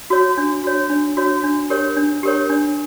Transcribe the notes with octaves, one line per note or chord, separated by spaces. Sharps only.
F#4 C#5
D4
F#4 C#5
D4
F#4 C#5
D4
G4 A#4 C#5
D4
G4 A#4 C#5
D4